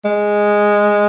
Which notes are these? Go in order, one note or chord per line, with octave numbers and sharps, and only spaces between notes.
G#3